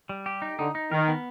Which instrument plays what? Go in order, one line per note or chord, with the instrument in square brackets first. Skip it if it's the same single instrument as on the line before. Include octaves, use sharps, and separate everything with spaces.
[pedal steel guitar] G3
G4
D#4
[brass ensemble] D3 [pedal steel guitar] D#4
[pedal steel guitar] D#4
[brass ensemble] D#3 [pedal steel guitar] A#4
[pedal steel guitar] B3